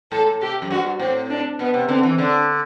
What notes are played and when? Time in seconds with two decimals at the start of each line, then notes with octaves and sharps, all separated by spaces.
0.12 A2 A4
0.26 A2
0.41 C3 G4
0.62 F#2
0.71 G2 F#4
1.00 A2 C4
1.30 D4
1.59 B2 B3
1.74 C3
1.88 D3 C4
2.03 E3
2.18 D3 D4